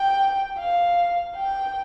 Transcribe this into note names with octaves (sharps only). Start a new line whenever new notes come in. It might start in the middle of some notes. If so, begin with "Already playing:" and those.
Already playing: G5
F5
G5